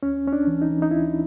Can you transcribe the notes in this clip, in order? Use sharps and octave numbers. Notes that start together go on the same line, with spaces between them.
D2 C#4
D2 C#4
D4
E3
D#4
E3
D#4
D2 E4